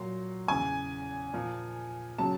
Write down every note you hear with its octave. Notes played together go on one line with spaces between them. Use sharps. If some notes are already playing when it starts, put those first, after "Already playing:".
Already playing: A#2 F#3 C6
E2 C#3 E3 G#5
A#2 F3
C#3 F#3 A5